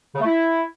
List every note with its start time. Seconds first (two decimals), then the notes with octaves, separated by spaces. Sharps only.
0.15 C#3
0.21 A3
0.26 E4